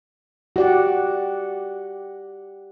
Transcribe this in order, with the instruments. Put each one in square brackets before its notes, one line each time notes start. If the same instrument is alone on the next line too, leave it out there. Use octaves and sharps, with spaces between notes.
[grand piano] F#4 [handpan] G4 D5 F#5